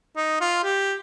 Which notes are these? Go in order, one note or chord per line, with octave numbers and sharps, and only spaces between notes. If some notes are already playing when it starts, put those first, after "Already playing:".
D#4
F4
G4